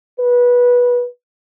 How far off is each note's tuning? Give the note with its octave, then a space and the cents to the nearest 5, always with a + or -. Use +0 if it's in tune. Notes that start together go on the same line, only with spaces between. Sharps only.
B4 -20